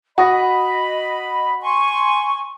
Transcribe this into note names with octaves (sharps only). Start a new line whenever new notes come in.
F#4 D#5 B5 D#6 A#6
G#5 C6 C#6